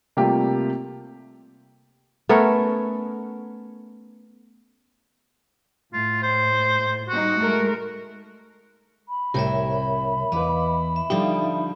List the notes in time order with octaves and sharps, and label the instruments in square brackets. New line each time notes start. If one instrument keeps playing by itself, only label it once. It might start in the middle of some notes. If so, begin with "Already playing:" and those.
[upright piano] C3 G3 A3 A#3 F4 G4
[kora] A3 B3 C#4 A#4
[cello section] A2 [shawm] F4
[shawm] C5
[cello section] G3 D#4 [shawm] F#4
[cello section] G#3 A3 A#4
[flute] B5
[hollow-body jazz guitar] C2 G4 [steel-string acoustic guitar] A2 C3 E4 [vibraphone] A#4 C#5 E5
[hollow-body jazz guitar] E2 B4 [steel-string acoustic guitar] E4 [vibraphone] D#5 F5 D6
[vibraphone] E5
[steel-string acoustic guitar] D3 F3 G3 [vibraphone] D#4 E5 F5 [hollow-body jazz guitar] G4